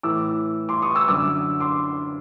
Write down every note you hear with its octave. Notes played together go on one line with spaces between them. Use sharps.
A2 E3 D6 E6
C6 D6
C#6 D#6
D6 E6
F#2 D3 D6 E6
C6 D6